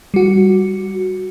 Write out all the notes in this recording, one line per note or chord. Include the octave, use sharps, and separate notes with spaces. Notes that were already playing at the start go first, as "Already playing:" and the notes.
G3 F#4